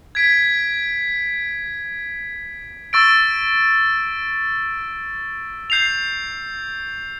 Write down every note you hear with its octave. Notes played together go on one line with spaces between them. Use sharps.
G#6 B6 D7
C#6 E6 A6 D7
G6 C7 F7